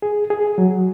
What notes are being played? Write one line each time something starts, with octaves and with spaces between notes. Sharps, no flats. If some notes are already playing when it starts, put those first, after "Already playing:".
G#4
G#4
F#3